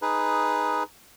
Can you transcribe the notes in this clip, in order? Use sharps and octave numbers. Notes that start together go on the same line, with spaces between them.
D#4 G#4 B4